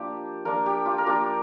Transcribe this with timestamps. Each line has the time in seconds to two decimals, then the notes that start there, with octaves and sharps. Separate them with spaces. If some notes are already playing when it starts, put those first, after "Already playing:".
Already playing: F3 A#3 D4 G4
0.45 F3 A#3 D4 A#4
0.66 G4
0.86 F4
0.98 A#4
1.06 F3 A#3 D4 G4